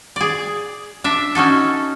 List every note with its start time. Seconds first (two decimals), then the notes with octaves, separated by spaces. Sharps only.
0.16 G#4 D5
1.04 D4 E5
1.35 C#4 D#4 F#4 A4